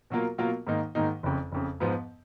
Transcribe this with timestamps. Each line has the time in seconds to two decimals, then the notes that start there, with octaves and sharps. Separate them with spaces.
0.10 B2 F#3 A#3 F4 A#4
0.38 B2 F#3 A#3 F4 A#4
0.67 G#2 D#3 A#3 D#4
0.95 G#2 D#3 A#3 D#4
1.23 F#1 F2 C#3
1.52 F#1 F2 C#3
1.80 G#2 F3 B3